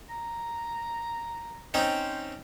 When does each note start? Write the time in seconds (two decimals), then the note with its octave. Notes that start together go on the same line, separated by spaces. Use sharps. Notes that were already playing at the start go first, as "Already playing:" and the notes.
0.10 A#5
1.74 C4 C#4 D#4 C5